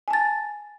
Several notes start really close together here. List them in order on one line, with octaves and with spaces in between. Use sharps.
G#5 A5 A6